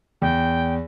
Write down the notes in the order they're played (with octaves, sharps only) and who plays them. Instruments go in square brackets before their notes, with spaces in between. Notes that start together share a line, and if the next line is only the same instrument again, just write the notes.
[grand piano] E2 [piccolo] G5